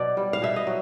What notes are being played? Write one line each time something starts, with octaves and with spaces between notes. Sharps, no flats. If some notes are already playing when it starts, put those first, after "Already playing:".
Already playing: B2 F#3 D5
G3
F5
B2 E5
D#5
F#3